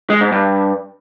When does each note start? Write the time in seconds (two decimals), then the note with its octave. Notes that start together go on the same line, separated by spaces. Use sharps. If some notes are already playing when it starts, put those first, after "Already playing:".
0.10 G#3
0.21 G#2
0.32 G2